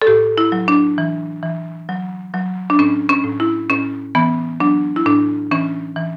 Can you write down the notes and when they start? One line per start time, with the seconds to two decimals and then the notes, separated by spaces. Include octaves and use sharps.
0.02 A4
0.07 A2 G4
0.38 E4
0.52 F#3
0.68 D4
0.98 E3
1.43 E3
1.89 F#3
2.34 F#3
2.70 D4
2.79 A2 C#4
3.09 C#4
3.24 A2
3.40 E4
3.70 A2 C#4
4.15 E3 B3
4.60 F#3 D4
4.96 E4
5.05 A2 D4
5.51 E3 C#4
5.96 E3